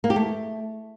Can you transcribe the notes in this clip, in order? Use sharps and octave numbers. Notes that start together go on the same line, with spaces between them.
A#3
G4
A3